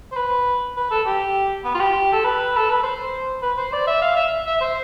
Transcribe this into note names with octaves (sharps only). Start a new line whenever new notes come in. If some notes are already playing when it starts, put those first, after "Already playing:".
C5
B4
B4
A4
G4
B3
F4
G4
A4
B4
A4
B4
C5
B4
C5
D5
E5
F5
E5
E5
C5